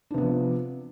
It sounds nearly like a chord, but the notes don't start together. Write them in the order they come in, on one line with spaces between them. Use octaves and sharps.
D4 C3 B3 F3